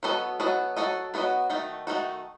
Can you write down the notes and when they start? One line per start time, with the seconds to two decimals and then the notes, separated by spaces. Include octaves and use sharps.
0.03 F#3 B3 F#4 A4 D#5
0.40 F#3 B3 F#4 A4 D#5
0.76 F#3 B3 F#4 A4 D#5
1.14 F#3 B3 F#4 A4 D#5
1.50 D#3 A3 D#4 F#4
1.87 D#3 A3 D#4 F#4